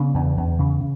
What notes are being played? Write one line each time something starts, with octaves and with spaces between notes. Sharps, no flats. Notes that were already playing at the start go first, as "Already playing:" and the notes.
Already playing: C#3 B3 D4
E2
E2
C#3
C#3